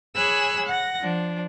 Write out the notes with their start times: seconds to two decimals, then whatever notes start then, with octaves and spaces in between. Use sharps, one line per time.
0.15 G#4 C#5 G#5 B5 E6 F#6
0.66 F#5 A#6
0.99 F3 D4